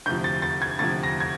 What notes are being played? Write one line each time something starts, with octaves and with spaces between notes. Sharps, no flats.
D2 C3 F3 G6
A6
A6
G#6
D2 C3 F3 A6
A#6
G#6